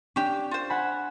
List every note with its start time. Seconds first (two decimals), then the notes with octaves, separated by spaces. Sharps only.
0.16 C#4 D4 G4
0.51 F4 C5
0.70 F#5 G#5 B5